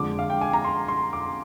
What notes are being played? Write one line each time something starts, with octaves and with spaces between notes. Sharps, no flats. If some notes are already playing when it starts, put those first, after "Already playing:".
Already playing: F2 D3 G#3 D6
F5
G5
G#5
A#5
C6
C6
D6